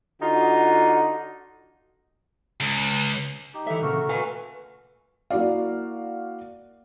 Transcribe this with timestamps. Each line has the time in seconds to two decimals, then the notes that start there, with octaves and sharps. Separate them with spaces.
0.21 D3 D#4 F4 F#4
2.60 C#2
3.54 D#4 G4
3.67 E3 A4 E5
3.82 A#2 C#3 A3 F#4 A#4
4.09 B4 F5 G#5
5.30 A#3 E4 F#4 D5 F5